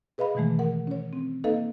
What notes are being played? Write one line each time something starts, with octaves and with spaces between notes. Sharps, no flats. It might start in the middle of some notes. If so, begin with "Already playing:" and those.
G#4 B4 D#5 F5 B5
B2 D#3 E3 G#3 A3
A#4 F#5
C#4 C#5
C4
A#3 D#4 A4 B4 D#5 F5